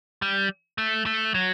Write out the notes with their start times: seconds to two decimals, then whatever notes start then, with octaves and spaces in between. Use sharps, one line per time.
0.22 G3
0.78 A3
1.06 A3
1.34 F#3